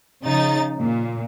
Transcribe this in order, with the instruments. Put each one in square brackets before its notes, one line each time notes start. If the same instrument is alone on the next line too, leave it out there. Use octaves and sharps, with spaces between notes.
[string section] C#3 F3 D#4 A6
A#2